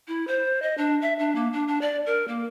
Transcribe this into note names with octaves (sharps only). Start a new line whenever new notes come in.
E4
C5
D#5
D4
E5
D4
A#3
D4
D4
D5
A#4
A#3